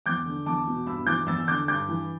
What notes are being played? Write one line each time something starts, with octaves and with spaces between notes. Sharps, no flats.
E2 D6 G6
D3
E2 A5 D6
B2
G2 B5 E6
E3 D6 G6
E2 E6 A6
E6
D3 D6 G6
G2 D6 G6
E3